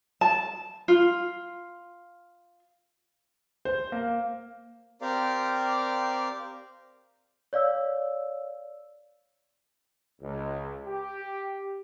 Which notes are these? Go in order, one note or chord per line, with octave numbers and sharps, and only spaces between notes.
A5
F4
C5
A#3
C4 G4 A#4 D5 F5
C#5 D5 F5 E6
C#2
G4